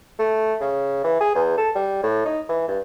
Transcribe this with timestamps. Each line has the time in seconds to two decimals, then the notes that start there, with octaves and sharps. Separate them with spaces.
0.19 A3
0.61 C#3
1.04 E3
1.21 G#4
1.35 E2
1.58 A4
1.75 G3
2.03 A2
2.25 D#4
2.49 E3
2.68 G2